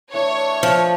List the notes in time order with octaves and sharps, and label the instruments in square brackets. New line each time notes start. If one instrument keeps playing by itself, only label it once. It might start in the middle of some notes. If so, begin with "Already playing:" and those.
[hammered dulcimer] E3 A3 D4 [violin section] C#5
[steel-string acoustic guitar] F3